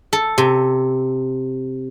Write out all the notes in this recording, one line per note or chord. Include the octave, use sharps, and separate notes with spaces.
A4
C3